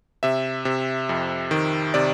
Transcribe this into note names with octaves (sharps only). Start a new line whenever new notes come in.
C3 E5
C3
F2
D#3
C3 D5